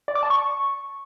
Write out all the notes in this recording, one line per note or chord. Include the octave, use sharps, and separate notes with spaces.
D5
D6
A5
C#6